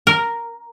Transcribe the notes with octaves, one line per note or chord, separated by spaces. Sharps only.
A#4